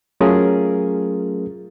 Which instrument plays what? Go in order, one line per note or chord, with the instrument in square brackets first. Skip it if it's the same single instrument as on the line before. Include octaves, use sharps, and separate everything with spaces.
[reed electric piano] F#3 A3 C#4 F4 G#4 A#4